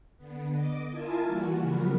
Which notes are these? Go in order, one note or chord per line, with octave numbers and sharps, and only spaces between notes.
D3 B3
D#5 D6
E4 F4 A#4 G#5 A5
E3 G3 A#3 F#4
C#3 F3 F#3 B3 A#4 B4